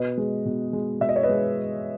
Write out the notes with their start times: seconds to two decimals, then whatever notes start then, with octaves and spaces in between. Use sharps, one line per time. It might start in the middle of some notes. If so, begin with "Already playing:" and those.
Already playing: B2 B4 D#5
0.18 G#3
0.45 B2
0.73 G#3
1.01 B2 E5
1.09 D#5
1.16 C#5
1.23 B4 D#5
1.29 G#3